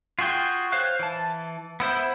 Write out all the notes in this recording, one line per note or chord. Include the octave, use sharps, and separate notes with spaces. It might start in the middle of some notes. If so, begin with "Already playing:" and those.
F4 F#4 G#4 G5
C5 C#5 F5 F#6
E3 A5
B3 E4 C5